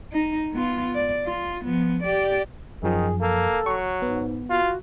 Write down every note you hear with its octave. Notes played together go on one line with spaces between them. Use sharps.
D#4
B3 F4
D5
F4
F3 B3
G4 D5
F#2 D#3 F3 G#4
A#3 A4
F#3 C#6
G#2 B3
F4 F#4